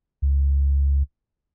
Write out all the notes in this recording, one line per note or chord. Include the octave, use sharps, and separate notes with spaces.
C#2